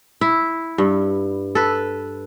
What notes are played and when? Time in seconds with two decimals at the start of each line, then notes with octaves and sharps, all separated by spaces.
0.21 E4
0.78 G2
1.55 A4 B4